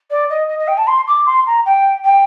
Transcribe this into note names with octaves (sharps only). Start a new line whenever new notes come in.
D5
D#5
D#5
D#5
G5
A5
C6
D6
C6
A#5
G5
G5